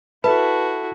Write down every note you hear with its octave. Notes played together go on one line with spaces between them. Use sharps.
E4 F#4 A4 B4 E5 A5 B5